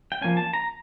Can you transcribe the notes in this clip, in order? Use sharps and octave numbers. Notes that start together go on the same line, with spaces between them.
G5
F3 A#3 C#4 G#5
A5
A#5